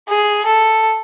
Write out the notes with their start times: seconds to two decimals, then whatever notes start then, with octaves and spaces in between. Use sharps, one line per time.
0.09 G#4
0.46 A4